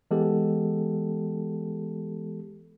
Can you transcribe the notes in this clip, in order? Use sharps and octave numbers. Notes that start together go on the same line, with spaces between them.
E3 G#3 B3 G4 A4